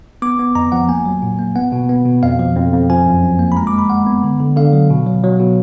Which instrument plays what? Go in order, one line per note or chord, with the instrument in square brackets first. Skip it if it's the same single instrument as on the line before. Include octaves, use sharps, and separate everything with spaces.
[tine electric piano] B3 D6
B3
F2 A#5
F3 F#5
A#3 G#5
F#3
A#2
A#3
B3 F#5
B2
B3
B2
F2 F5
F3
F2
F2
F3 G#5
F#2
F#2
A#3
B5
G#3 A#5
D6
G#3
B5
G#3 F#5
B3
D3
D3
D3 F5
F#3
B2
F#3
F#3
B2